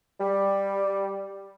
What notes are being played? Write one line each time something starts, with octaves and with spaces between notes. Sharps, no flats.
G3